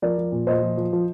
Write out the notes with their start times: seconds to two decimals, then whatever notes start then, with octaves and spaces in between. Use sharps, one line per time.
0.02 F3 A#4 D5
0.18 F3
0.32 A#2
0.47 A#2 C5 D#5
0.62 F3
0.77 F3
0.93 F3